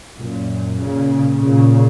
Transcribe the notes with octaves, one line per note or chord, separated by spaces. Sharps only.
F#2 A#2
A#2 C#3
A#2 C#3